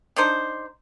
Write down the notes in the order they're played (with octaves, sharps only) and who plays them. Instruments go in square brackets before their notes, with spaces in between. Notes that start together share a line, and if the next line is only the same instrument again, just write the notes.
[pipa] D4 D#4 C5